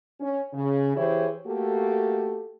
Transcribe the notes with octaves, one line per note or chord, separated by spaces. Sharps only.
C#4
C#3
E3 E4 G4 G#4 C5 C#5
A3 A#3 F#4 G4 A4